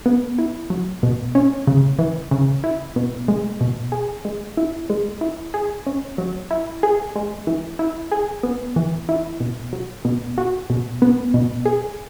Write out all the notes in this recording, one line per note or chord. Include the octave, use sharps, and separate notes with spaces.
B3
E4
F#3
B2
C#4
C#3
E3
C#3
E4
B2
G#3
B2
G#4
G#3
E4
G#3
E4
G#4
C#4
F#3
E4
G#4
G#3
E3
E4
G#4
B3
E3
E4
B2
F#3
B2
F#4
B2
B3
B2
G#4